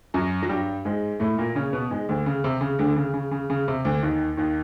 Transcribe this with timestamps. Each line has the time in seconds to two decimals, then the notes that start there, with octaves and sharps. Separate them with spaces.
0.14 F#2 F#3
0.43 F#3
0.49 G2 G3
0.85 G#2 G#3
1.20 A2 A3
1.38 A#2 A#3
1.55 C#3 C#4
1.73 B2 B3
1.90 G#2 G#3
2.09 D2 D3
2.26 C#3
2.44 C3
2.61 C#3
2.79 D2 D3
2.96 C#3
3.14 C#3
3.31 C#3
3.50 C#3
3.68 C3
3.85 D2 D3
4.02 D#2 D#3
4.37 D#2 D#3